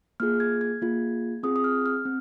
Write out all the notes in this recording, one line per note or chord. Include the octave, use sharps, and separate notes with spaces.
A#3 F4 G#4 F6
G#6
G#6
A#3 F4 G#4
C4 F4 G#4 D#6
D#6
F6
F6
C4